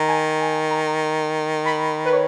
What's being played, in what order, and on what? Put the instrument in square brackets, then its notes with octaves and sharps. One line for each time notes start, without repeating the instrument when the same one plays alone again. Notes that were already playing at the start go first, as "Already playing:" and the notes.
Already playing: [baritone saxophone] D#3 [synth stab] A#5
[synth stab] G#5
G#5
A#5
B5
B4
C#5